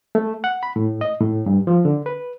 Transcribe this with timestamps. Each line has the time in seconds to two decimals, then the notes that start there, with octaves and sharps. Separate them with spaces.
0.15 A3
0.44 F#5
0.63 B5
0.76 A2
1.01 D#5
1.21 A2
1.46 G2
1.67 F3
1.85 D3
2.06 B4